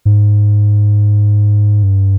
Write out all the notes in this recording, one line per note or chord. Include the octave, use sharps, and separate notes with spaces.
G#2
G2